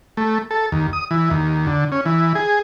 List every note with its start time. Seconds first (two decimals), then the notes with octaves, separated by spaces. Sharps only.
0.17 A3
0.51 A4
0.72 D#2
0.93 D#6
1.11 E3
1.31 D#2
1.67 D3
1.92 C#4
2.06 E3
2.35 G#4